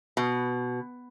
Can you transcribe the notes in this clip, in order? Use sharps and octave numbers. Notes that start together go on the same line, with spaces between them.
B2